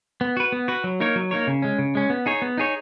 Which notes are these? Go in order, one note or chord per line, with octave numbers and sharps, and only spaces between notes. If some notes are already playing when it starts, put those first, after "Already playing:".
B3
F#4 B4
B3
F#4 B4
F#3
A#3 D#4 A#4 C#5
F#3
A#3 D#4 A#4 C#5
C#3
G#3 C#4
C#3
G#3 C#4
B3
D#4 G#4 C#5
B3
D#4 G#4 C#5